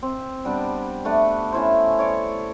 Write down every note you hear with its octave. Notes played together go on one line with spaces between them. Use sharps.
C4
G3 B3 D4 G4
A3 D4 B4
C#4 E4 C5
C#5 D5 C#6